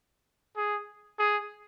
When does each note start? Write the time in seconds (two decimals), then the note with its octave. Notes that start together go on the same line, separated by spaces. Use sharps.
0.57 G#4
1.19 G#4